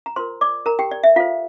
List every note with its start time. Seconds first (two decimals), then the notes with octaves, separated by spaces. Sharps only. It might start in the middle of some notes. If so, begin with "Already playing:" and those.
0.06 A#5
0.16 F4 A#4 C5 C6
0.41 D5 D6
0.66 A#4 A#5
0.79 G4 G5
0.91 D5
1.03 E5
1.16 F4 A4 C5 F5